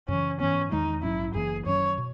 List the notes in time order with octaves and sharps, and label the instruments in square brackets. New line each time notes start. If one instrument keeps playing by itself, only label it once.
[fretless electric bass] F#2 C#3 E3 [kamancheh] C#4
[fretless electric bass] G#2 E3 B3 [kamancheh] C#4
[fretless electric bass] E2 D#3 G#3 [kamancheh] D#4
[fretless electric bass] A#1 G#2 F#3 C#4 [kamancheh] E4
[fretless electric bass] F#1 F#2 E3 A#3 [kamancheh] G#4
[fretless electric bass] F#2 D#3 F#3 C#4 [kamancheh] C#5
[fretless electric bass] B2